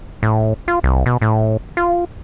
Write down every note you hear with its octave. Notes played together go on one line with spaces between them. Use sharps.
A2
F4
C2
B2
A2
F4